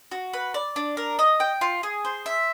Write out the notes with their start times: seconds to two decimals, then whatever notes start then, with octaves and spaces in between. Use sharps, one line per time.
0.11 F#4
0.33 B4
0.54 D5
0.76 D4
0.97 A#4
1.19 D#5
1.40 G5
1.61 F4
1.83 G#4
2.05 C5
2.26 E5